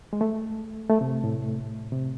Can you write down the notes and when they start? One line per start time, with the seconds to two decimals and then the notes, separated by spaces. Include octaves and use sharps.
0.13 G#3
0.21 A3
0.90 A3
1.01 C3
1.24 A2
1.92 C3